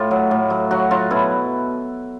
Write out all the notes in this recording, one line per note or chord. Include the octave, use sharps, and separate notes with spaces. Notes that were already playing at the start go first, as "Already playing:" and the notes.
Already playing: A2 F4
F#3
A2
F#3
F#3 F#4
F#3 F4
B2 E4